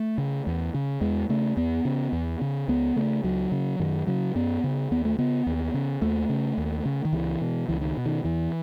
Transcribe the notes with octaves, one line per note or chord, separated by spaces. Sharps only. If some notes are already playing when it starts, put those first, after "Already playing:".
Already playing: A3
C#3
E2
C#3
E2 G#3
C#3 A3
E2 B3
C#3
E2
C#3
C#2 B3
C#3 A3
C#2 F#3
C#3
F#2 D#3
C#3 F#3
F#2 B3
C#3
D#2 B3
A3
C#3 B3
D#2
C#3
D#2 A3
C#3
D#2
C#3
D#3
C#2 E3
B2
C#2 E3
D#3
B2
D#3
E2 E3